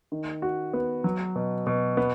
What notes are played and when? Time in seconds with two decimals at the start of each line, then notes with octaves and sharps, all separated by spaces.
0.12 D#3
0.42 F#4
0.73 B3
1.04 F#3
1.36 B2
1.67 B2
1.97 B3